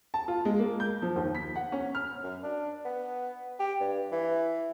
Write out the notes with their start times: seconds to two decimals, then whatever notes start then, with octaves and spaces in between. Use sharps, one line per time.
0.14 A5
0.28 F4
0.45 G#3
0.59 A#3
0.80 G6
1.02 F3
1.16 D#2
1.35 B6
1.56 F#5
1.72 C#4
1.95 F6
2.23 F#2
2.43 D4
2.85 B3
3.59 G4
3.80 G2
4.12 E3